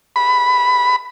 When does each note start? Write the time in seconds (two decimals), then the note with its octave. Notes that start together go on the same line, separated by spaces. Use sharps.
0.16 B5